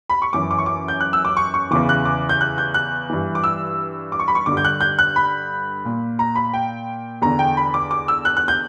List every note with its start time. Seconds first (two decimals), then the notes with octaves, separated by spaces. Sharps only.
0.09 B5
0.22 C#6
0.33 F#2 E3 D6
0.51 D6
0.58 C#6
0.66 D6
0.88 G6
1.00 F#6
1.13 E6
1.25 D6
1.37 C#6
1.54 C#6
1.71 E2 C#3 E3 D6
1.89 F#6
2.05 D6
2.29 G6
2.41 F#6
2.58 G6
2.74 F#6
3.10 G2 E3
3.35 D6
3.44 E6
4.12 D6
4.19 C#6
4.28 B5
4.35 C#6
4.46 G2 D3 D6
4.57 G6
4.65 F#6
4.81 G6
4.99 F#6
5.16 B5
5.85 A#2
6.19 A#5
6.36 B5
6.54 G5
7.22 E2 D3 A#5
7.39 G5
7.57 B5
7.74 D6
7.91 D6
8.08 E6
8.25 F#6
8.37 F#6
8.48 G6